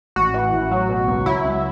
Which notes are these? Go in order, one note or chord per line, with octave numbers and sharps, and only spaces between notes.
A1 F#4
E3
A1
F#3
B2
C#2
F#3 E4
C#2